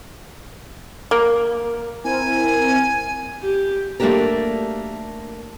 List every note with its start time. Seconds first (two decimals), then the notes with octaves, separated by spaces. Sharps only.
1.11 A#3
2.04 C4 E4 A#4 G#5
3.43 G4
4.00 A3 A#3 D4 F#4 G4 A#4